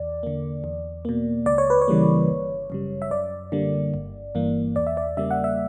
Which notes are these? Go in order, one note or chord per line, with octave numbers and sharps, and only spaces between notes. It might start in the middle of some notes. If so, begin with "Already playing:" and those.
Already playing: E2 D5
D3 A#3
E2
B2 A#3
C#2 D5
C#5
B4
C#5
C#3 E3 G3 A#3
G1
F#2 C#3 G3
E5
F#2 D5
D3 G3 A#3
G1
G2 E3 A#3
E2 D5
E5
D5
C#3 G3 A#3 E5
F#5
E5